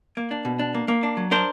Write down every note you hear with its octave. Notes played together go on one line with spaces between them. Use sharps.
A#3
D4
B2
D4
A#3
A#3
D4
F#3
D4 A#4 C5